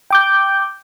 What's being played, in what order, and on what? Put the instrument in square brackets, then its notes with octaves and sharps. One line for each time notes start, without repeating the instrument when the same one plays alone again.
[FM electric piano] G5 D6 G6